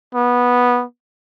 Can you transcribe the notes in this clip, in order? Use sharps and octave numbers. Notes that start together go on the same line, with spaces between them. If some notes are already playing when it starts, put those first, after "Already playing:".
B3